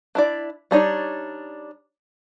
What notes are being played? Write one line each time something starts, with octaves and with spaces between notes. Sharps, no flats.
D4 E4 D5
G3 D4 D#4 C#5